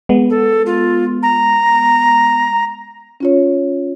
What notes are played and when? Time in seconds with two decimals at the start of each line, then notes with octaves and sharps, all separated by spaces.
0.09 G#3 B3
0.30 A4
0.66 F4
1.23 A#5
3.20 C#4 F4 C#5